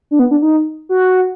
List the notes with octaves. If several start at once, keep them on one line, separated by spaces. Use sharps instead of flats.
D4
B3
D4
D#4
F#4